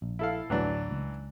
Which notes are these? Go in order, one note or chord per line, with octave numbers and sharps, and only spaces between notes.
A#1
E4 A4 F5
A1 D2 A2 E3 F#3 D4
C#2